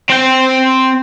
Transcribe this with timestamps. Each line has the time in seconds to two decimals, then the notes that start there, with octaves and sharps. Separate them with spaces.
0.10 C4 G5